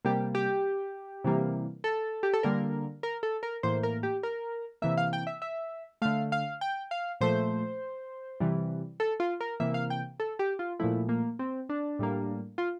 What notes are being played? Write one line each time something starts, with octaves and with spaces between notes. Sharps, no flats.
C3 G3 A#3 G4
G4
C3 E3 G3 A#3
A4
G4
A4
D3 G3 A#3 A#4
A#4
A4
A#4
A2 E3 A#3 C5
A#4
G4
A#4
C3 E3 A#3 E5
F5
G5
E5
E5
D3 A3 F5
F5
G5
F5
A#2 F3 A3 C5
C3 E3 G3
A4
F4
A#4
C3 E3 A#3 E5
F5
G5
A4
G4
F4
A#2 F3 A3 E4
A#3
C4
D4
A2 G3 A#3
F4